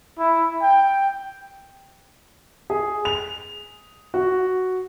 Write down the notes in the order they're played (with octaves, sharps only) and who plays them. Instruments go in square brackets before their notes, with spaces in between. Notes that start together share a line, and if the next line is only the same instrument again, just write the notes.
[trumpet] E4
G5
[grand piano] G#4
F7
F#4